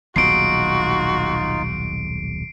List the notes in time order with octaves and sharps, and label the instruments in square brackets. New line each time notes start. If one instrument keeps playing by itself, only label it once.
[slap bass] D#1 B1 G#2 [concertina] D#4 F4 [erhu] F#4 [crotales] C7 D7